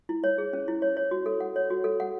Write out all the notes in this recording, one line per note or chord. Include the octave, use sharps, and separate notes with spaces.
E4
C#5
G#4
C#4
E4
C#5
C#5
F#4
A4
F#5
C#5
F#4
A4
F#5